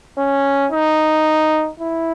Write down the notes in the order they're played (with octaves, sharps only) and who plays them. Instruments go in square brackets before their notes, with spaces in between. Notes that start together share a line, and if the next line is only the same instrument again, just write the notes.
[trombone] C#4
D#4
E4